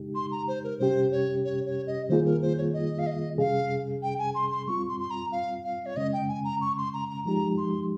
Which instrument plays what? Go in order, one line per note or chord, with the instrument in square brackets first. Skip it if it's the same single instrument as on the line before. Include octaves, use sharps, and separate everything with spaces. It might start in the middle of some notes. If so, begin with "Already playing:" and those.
Already playing: [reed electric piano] C#3 G#3 D#4 G4
[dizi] C6
A#5
C5
A#4
[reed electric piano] C3 G3 C#4 G4 [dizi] C5
[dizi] C#5
C#5
C#5
D#5
[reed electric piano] D#3 G3 A#3 F4 G#4 [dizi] C5
[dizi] A#4
C5
C#5
D#5
F5
D#5
[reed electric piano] C3 G3 C#4 G#4 [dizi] F5
[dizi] G5
G#5
C6
C6
[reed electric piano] G3 C4 F4 [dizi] C#6
[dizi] C6
C6
A#5
F5
F5
C#5
[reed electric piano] C#3 G#3 C#4 [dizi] D#5
[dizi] G5
G#5
A#5
C#6
C6
A#5
A#5
[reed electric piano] F3 G#3 D#4 G4 [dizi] A#5
[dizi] C6